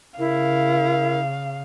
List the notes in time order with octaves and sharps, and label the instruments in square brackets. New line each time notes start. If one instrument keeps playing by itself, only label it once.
[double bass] C#3 [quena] E4 [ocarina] A#4 [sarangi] F5